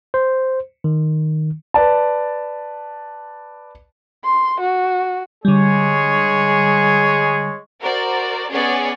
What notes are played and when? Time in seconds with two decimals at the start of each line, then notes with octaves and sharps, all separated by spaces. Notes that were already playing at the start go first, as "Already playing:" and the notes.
0.14 C5
0.84 D#3
1.74 B4 D5 A5
4.24 C6
4.60 F#4
5.45 D3 G3 G#3 G#4 C#5
7.81 F#4 A#4 C5 D5
8.51 B3 C#4 G#4 C#5 D5